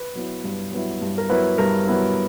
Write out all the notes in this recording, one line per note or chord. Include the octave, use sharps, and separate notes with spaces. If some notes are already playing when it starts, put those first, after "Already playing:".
Already playing: B4
F#3 B3 E4
G2
F#3 B3 E4
G2
A#4
F#3 B3 E4 B4
G2 A#4
F#3 B3 E4